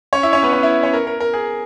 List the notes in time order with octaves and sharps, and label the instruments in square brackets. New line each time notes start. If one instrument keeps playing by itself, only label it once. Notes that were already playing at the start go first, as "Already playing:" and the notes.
[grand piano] C#4 C#5
E4 E5
C#4 C#5
B3 B4
C#4 C#5
E4 E5
C#4 C#5
A#4
A#4
A#4
G#4